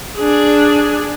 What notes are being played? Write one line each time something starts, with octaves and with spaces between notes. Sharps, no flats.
D4 G#4